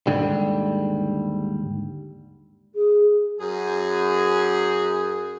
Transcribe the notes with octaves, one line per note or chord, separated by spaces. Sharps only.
D#2 G#2 D3 G3
G#4
F#2 G#4